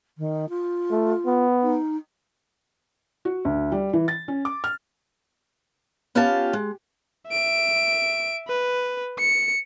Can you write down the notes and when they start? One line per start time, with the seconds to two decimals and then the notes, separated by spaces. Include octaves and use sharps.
0.18 D#3
0.49 F4
0.91 A3
1.26 B3
1.62 D#4
3.25 F#4
3.45 D2
3.72 G3
3.93 E3
4.08 A6
4.28 C#4
4.45 D6
4.64 F6
6.15 B3 C#4 F4 G4 F5 A5
6.53 G#3
7.30 E5 D7
8.48 B4
9.19 C#7